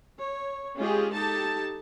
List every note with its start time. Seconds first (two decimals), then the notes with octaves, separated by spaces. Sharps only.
0.19 C#5
0.77 G#3 C#4 F4 G4 G#4
1.14 D#4 G4 A4 A5